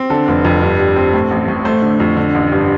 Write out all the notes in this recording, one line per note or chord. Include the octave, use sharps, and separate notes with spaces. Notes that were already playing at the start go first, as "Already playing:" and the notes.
Already playing: C4
D3 A4
F1
F2
G2
G3
C4
A2
A1
A2
A3 C5
D3
F2
D3
A1
G2